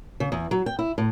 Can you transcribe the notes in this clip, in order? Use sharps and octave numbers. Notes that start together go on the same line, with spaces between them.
C#3
E2
F#3
G5
E4
A2